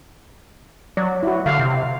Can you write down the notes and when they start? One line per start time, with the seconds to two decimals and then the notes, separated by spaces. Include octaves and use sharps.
0.97 F#3 D5
1.23 E4 F#4
1.46 D3 F5
1.59 C3